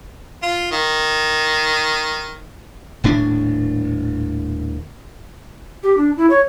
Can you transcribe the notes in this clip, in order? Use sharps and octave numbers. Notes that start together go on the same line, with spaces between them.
F4
D#3
D#1 A2 D4
G4
D4
E4
C#5